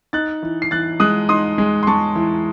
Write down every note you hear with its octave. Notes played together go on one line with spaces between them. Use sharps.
D#4 F#6 A6
E3
C7
E3 F#6 A6
G#3 D#6 F#6
D#4 C6 D#6
G#3
C6
G#3 A5 C#6
E3